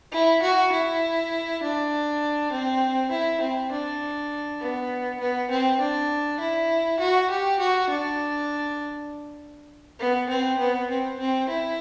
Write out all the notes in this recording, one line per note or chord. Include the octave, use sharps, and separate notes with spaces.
E4
F#4
E4
D4
C4
E4
C4
D4
B3
B3
C4
D4
E4
F#4
G4
F#4
D4
B3
C4
B3
C4
C4
E4